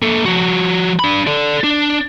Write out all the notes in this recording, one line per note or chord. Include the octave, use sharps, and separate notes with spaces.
A#3 A4
F3 F#4
D4 B5
A4 D5
D4